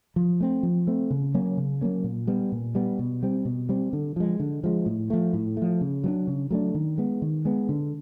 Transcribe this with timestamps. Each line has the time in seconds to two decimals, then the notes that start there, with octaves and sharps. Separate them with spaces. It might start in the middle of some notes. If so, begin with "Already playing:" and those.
0.16 F3
0.40 A3 C4
0.63 F3
0.87 A3 C4
1.10 C#3
1.34 F#3 A#3 C#4
1.57 C#3
1.81 F#3 A#3 C#4
2.04 A#2
2.27 G3 B3
2.52 A#2
2.75 G3 B3
2.99 B2
3.23 G3 C4
3.45 B2
3.69 G3 C4
3.93 D3
4.16 F3 G#3
4.40 D3
4.64 F3 G#3
4.86 A2
5.10 F3 A3
5.33 A2
5.57 F3 A3
5.81 C#3
6.04 F#3 A3 D4
6.27 C#3
6.51 F#3 A3 D4
6.74 D#3
6.98 G#3 B3
7.22 D#3
7.45 G#3 B3
7.69 D3